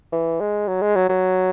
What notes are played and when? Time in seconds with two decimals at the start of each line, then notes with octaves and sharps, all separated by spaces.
0.12 E3
0.41 G#3
0.68 F#3
0.82 G#3
0.96 F#3
1.09 F#3